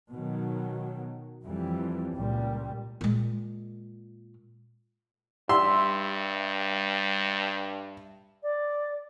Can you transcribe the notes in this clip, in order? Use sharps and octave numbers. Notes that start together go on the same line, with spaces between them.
B2 D#3 F#3
F2 E3 G3
C#2 A#2 G3
A#2 G#3
G2 G3 E5 C6
D5